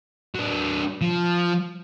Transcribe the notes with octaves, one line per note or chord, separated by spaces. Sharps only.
F#3 D4
F3